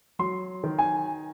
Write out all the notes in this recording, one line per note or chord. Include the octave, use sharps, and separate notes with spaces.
F#3 C6
D#3
G#5